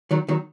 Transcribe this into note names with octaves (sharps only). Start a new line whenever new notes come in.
D#3 F#3
D#3 F#3